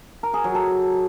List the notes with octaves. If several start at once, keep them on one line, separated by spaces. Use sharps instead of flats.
A#4
G#4
F#3
A4